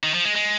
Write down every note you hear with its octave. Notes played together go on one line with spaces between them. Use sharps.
D#3
F3
G#3
G#3